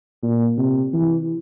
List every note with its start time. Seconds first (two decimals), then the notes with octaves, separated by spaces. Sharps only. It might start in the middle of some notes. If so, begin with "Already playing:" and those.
0.23 A#2
0.58 C3
0.93 E3